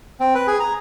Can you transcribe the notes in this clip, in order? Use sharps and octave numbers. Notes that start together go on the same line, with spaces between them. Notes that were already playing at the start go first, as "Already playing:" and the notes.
C4
B4
G#4
A#5